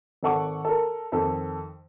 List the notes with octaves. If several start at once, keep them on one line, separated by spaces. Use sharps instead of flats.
G#1 D#3 A4 F#5 C#6 D6
A4 A#4
F2 D#3 A4